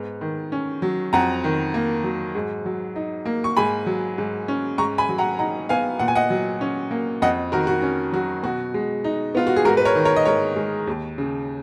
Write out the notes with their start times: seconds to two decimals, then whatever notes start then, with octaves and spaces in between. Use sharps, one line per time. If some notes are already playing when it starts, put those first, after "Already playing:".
Already playing: G#2 B3
0.21 D#3
0.52 C#4
0.82 F#3
1.13 F2 F#5 A#5
1.44 D#3
1.74 A#3
2.04 F#3
2.35 G#2
2.65 F#3
2.96 D#4
3.26 A#3
3.44 C#6
3.57 G#2 G#5 B5
3.86 F#3
4.18 G#2
4.48 C#4
4.78 G#2 A#5 C#6
4.98 G#5 B5
5.09 F#3
5.18 F#5 A#5
5.39 D#4 F#5 A#5
5.69 B3 F5 G#5
5.99 A#2 F#5
6.08 G#5
6.16 D#5 F#5
6.30 F#3
6.61 C#4
6.91 A#3
7.22 F2 D#5 F#5
7.52 D#3 F#4 A#4
7.67 F#4
7.82 C#4
8.12 F#3 F#4
8.43 B2 F#4
8.74 G#3
9.04 D#4
9.35 B3 F4
9.47 F#4
9.56 G#4
9.65 G#2 F#4 A#4
9.77 B4
9.85 A#4 C#5
9.95 D#3
10.05 A#4 C#5
10.16 D#5
10.26 G#2 A#4 C#5
10.56 G#3
10.87 D#2
11.18 C#3